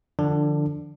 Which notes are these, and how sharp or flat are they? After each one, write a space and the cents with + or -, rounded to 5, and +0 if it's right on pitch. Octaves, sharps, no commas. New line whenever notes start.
D3 +25 F3 -10 D4 +0